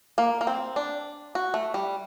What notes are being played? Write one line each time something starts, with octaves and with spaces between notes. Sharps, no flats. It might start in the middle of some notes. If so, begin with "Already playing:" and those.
A#3
A#3
C4
D4
F#4
A3
G3